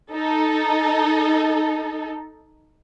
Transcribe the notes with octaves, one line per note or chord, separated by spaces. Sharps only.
D#4 A4